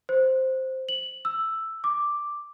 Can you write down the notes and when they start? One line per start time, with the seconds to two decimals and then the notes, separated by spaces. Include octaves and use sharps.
0.09 C5
0.89 F#7
1.25 E6
1.84 D6